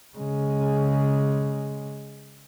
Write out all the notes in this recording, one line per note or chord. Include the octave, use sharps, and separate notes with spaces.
C#3 G#3